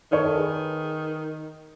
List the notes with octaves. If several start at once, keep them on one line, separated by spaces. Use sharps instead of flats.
D#3 A4 C#5
A4
G#4 B4